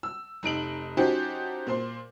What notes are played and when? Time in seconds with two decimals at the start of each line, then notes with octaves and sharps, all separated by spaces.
0.03 E6
0.43 F1 D#4 D7 F#7
0.97 F3 C#4 D#4 F#4 G4 C5
1.67 A#2 C5 C6